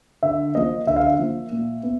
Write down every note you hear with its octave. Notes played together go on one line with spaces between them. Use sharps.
D3 E5
F3 A#3 D#5
D3 E5
F5
E5
F3 A#3
A#2
B3